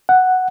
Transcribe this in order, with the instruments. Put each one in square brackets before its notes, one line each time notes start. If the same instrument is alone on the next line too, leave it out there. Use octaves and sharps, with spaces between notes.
[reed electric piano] F#5